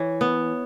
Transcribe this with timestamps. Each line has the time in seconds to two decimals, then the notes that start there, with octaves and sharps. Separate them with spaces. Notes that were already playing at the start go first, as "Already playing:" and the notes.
Already playing: E3 C#5
0.21 B3